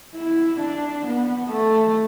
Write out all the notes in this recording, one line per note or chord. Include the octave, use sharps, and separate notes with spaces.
E4
D4
B3
A3